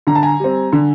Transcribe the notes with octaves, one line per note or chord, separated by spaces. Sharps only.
D3 A#5
A5
G#5 A#5
G3 C4
D3